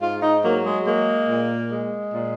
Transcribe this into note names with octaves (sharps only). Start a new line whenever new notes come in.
G#2 F4
D#4
F#3 A#3
G#3
G#3 A#3
A#2
G#3
A#2